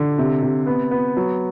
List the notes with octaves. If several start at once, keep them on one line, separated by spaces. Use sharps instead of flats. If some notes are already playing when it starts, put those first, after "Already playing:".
Already playing: D3
C3
C3
B3
B3
F#3